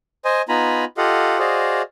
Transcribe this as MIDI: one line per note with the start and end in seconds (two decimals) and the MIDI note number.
0.25 0.42 72
0.25 0.42 75
0.25 0.42 80
0.49 0.85 59
0.49 0.85 63
0.49 0.85 65
0.49 0.85 80
0.49 0.85 82
0.49 0.85 83
0.97 1.39 65
0.97 1.39 67
0.97 1.39 69
0.97 1.39 75
0.97 1.39 77
0.97 1.39 78
1.39 1.82 66
1.39 1.82 68
1.39 1.82 72
1.39 1.82 74
1.39 1.82 75
1.39 1.82 77